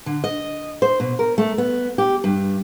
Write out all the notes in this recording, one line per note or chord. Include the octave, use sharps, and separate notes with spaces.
D3
D#5
C5
B2
A#4
A3
B3
G4
G2